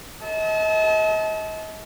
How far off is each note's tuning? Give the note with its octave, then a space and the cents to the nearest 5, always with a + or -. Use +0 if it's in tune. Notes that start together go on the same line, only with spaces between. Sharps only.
D#5 +40 A5 -30